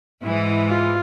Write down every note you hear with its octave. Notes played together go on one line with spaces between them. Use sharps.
G#2 E3 G#3 E4
F4